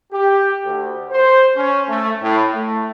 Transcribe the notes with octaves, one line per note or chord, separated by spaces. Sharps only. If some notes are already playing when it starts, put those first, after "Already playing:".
G4
D2
C5
C#4
A3
A2
A3